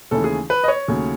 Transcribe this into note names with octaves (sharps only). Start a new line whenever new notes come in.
D#2 C#3 E3 A3 A4
G#4
B4
D#5
C#5
D#2 C#3 F#3 A3